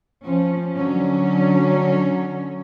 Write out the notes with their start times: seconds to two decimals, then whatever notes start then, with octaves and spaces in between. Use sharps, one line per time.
0.23 F3 C#4
0.76 D3 F#3 C#4